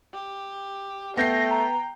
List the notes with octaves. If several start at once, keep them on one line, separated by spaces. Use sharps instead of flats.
G4
A3 B3 G5 G6 A#6 C7
A#5